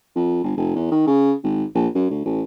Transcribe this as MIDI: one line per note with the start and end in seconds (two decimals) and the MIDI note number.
0.16 0.40 41
0.43 0.53 31
0.57 0.71 29
0.75 0.87 40
0.91 1.03 51
1.07 1.33 49
1.44 1.64 32
1.75 1.88 34
1.95 2.08 42
2.10 2.22 38
2.25 2.42 33